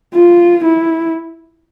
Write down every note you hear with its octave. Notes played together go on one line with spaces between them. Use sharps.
F4
E4